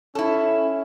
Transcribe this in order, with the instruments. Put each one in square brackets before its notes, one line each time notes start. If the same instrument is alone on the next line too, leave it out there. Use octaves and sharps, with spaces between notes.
[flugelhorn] C#4 [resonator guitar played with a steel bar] E4 A4